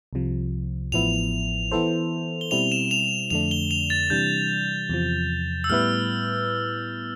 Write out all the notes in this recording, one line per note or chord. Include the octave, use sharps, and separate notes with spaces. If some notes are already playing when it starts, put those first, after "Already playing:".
C2 C3 F3
A1 A2 F3 B3 E4 F7
E3 B3 E4 A4 C5
G7
B2 G3 C4 E4 F7
E7
F7
F2 D3 A3 D4 F7
G7
F7
A6
C3 E3 G3 D4 G6
E2 C3 F3
E6
A2 G3 B3 E4 B4 F6